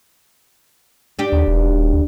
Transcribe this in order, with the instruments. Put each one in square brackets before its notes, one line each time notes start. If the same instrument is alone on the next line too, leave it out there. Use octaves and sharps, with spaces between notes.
[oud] D4 G4
[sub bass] D#2
E1
D#1
D2